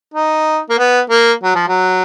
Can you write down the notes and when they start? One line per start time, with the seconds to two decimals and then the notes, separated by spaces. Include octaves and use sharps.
0.14 D#4
0.70 A#3
0.78 B3
1.10 A#3
1.43 F#3
1.55 F3
1.68 F#3